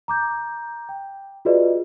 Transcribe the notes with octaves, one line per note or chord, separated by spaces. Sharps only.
A#5 D6 G6
G5
F4 F#4 G#4 B4 D5 D#5